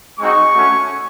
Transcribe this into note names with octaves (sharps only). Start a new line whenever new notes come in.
G#3 C4 D#4 F#4 C#6
A3 C#4 F#4